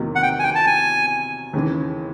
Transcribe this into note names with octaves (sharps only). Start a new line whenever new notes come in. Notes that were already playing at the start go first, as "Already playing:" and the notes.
Already playing: E2 C3 D#3 F#3 A#3
F#5
G5
G#5
G5
A5
G#5
D#2 C#3 E3